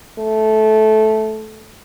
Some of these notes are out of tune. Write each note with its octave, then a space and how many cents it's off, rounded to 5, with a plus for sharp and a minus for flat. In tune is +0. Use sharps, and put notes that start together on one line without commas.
A3 -15